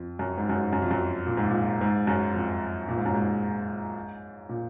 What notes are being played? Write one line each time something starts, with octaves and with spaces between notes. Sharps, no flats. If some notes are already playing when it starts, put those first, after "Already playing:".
Already playing: F2
F#2
G#2
F#2
G#2
F#2
F2
F#2
A#2
G#2
A#2
G#2
F#2
F2
A#2
G#2
F#2
G#2
A#2